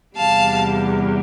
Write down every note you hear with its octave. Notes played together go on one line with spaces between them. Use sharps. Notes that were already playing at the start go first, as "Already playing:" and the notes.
E2 C3 G3 F5 A5